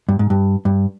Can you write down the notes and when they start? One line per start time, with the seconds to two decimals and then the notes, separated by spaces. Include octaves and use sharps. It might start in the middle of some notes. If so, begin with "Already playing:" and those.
0.09 G2
0.19 G#2
0.30 G2
0.65 G2